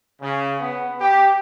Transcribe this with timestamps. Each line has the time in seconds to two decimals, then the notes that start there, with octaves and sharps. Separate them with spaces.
0.22 C#3
0.60 B3
1.01 G4